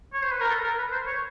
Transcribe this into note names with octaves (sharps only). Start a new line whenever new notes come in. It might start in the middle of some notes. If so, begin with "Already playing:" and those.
C#5
C5
B4
A#4
A4
A#4
B4
C5
C#5